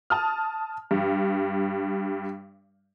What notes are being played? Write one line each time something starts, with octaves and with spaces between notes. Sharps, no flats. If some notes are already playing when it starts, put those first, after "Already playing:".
A5 D#6 F6
G2